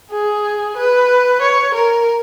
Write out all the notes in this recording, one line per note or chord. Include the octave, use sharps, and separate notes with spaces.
G#4
B4
C#5
A#4